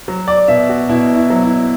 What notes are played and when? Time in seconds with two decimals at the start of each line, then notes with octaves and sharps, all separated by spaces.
0.08 F#3
0.28 D5
0.48 B2 E5
0.69 F#4
0.89 B2 E4
1.15 E4
1.30 F#3
1.44 E4